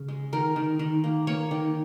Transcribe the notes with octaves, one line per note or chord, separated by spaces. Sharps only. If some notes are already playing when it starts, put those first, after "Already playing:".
Already playing: C#3
G#3
D#3 A#4
D#3
D#3
A#3
A#3 C#5
D#3